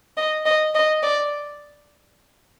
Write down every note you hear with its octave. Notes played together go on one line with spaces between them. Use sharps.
D#5
D#5
D#5
D5